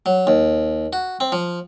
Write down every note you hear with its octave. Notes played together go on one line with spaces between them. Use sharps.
F#3
D#2
F#4
C4
F3